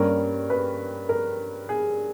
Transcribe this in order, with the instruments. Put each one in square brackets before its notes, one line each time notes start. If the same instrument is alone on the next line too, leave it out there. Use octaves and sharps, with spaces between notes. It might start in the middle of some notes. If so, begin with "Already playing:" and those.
Already playing: [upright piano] G2 G3 A#3 C#4 A#4
B4
A#4
G#4